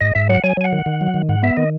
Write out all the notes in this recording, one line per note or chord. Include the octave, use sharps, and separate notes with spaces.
G#2 D#5
G#2 E5
F#3 F#5
F#3 G#5
F#3 G#5
F#5
D#3
D#3
F#3
D#3
G#2 F#5
B3 E5
D#3 D#5